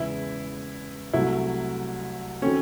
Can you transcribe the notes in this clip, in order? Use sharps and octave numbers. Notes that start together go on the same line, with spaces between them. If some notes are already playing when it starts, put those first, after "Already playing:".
Already playing: E2 C#3 E3 G#3 E4
C2 C3 F#3 A3 E4
D#3 F#3 C4 C#4 F#4 A4